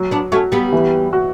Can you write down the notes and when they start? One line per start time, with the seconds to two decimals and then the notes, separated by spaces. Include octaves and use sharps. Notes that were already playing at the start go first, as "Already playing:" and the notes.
Already playing: F#3
0.11 B3 D4
0.32 A3 C#4 F#4
0.52 G3 B3
0.72 E3
1.13 F#4